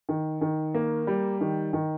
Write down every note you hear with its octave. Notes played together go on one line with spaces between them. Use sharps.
D#3
D#3
A#3
G3
D#3
D#3